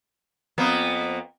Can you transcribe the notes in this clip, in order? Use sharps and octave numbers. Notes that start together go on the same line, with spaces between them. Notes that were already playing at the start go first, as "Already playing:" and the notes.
F2 A#3 B3